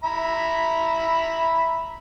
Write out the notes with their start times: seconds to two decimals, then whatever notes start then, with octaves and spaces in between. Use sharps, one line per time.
0.04 E5 A#5 B5